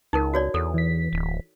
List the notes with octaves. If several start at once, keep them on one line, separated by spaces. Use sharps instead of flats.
C#2 D#4 A#4
F#4 C#5 D5
E2 A4
E3 B6
D1